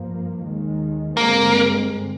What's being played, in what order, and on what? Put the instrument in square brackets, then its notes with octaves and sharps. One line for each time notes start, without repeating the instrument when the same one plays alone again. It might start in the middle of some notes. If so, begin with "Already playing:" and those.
Already playing: [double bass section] G2 F3 A#3
D#2 D#3 G#3
[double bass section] G2 D3 G#3 C4 [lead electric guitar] A#3